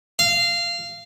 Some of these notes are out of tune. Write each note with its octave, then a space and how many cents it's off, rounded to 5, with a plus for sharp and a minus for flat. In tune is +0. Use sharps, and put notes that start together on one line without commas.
F5 -15